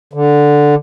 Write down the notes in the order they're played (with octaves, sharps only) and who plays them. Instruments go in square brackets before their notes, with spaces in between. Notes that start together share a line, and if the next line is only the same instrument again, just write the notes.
[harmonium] D3